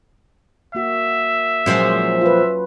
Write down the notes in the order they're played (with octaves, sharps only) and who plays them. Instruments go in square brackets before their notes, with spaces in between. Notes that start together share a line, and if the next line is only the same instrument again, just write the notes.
[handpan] A#3 F#4 [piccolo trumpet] E5
[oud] A#2 F3 G#3 [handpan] F#3 C#4 F#4
[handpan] F4 B4